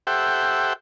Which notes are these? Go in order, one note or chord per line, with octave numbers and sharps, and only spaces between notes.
G4 A4 C5 E5 F#5 G5